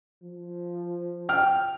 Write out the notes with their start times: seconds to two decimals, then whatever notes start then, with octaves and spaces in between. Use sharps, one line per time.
0.23 F3
1.29 G5 F6